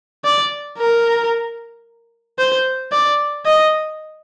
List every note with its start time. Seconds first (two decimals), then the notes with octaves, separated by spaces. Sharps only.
0.25 D5
0.79 A#4
2.39 C5
2.92 D5
3.46 D#5